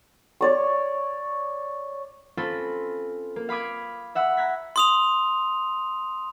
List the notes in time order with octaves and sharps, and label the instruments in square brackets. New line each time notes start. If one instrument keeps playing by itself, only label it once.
[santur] C#5 D5 C#6
[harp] C4 C#4 F4 A4 B5
A#3
F5 B5 D6 D#6 G#6
E5 F#5 B5 D#6 E6
A#5 F#6 G#6 B6
[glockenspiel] C6 D#6 F7